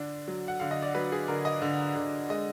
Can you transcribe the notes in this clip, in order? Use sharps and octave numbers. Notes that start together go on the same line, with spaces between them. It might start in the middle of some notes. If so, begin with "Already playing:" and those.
Already playing: D3 D4
F#3
F#5
D3 F5
D#5
D5
F#3 B4
G#4
D3 A#4
D#5
D3
D3
G#3 D#5